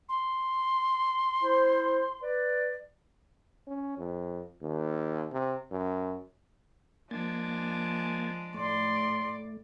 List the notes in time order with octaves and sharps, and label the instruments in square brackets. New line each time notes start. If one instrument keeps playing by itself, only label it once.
[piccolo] C6
[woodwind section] E4 C5
B4 D5
[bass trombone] C#4
F2
D#2
C3
F#2
[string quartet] F3 G#3 D4 [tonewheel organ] A#3 G#6 A6
[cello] A2 D5 [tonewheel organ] A3 [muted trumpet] C6